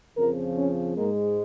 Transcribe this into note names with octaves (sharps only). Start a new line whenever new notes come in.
F2 C#3 F3 F4 A#4
C#4
G#2 G#3 A#3